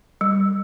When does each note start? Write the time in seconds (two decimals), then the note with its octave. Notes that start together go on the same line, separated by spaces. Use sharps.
0.21 G3